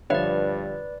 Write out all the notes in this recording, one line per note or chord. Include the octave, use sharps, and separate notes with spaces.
G2 D3 F3 B4 C#5 D5 E5 F5